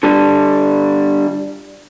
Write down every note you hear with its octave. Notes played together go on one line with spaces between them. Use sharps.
D3 G3